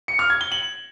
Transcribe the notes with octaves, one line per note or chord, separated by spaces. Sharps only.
C#7
F6
G#6
G7
F#7